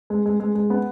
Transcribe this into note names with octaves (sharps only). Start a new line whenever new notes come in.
G#3
G#3
G#3
G#3
B3